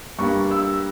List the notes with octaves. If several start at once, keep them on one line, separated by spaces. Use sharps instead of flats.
G2 G3 A#3 C#6
E6